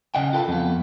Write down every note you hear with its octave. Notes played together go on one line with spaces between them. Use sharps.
C#3 D#5 F#5 G5
F4 A4 B4
F2 B3